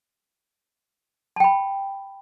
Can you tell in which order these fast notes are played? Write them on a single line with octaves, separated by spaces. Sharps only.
A5 G5 B5